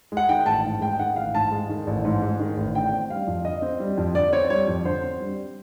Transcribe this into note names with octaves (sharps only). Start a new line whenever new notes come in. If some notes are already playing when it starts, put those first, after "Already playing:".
G#3
F#5
D#3 G5
A1 A5
G#2
G#3 G5
D#3 F#5
A1 F5
G#2 A5
G#3
D#3
A1
G#2
G#3
D#3
A1
D3 G5
C4
G3 F5
F2
D3 D#5
C4
G3
F2
D3 D5
C4 C#5
G3 C#5
F2
D3 C5
C4
G3